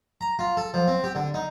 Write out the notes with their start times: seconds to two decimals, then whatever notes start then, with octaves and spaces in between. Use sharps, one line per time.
0.21 A#5
0.39 F4
0.57 A4
0.74 F3
0.88 C4
1.04 G4
1.15 D3
1.34 D#4